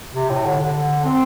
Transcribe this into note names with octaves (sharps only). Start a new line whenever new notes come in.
C3
A2
D3
D3
C4